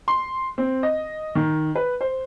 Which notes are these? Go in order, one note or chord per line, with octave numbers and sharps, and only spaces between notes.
C6
C4
D#5
D#3
B4
C5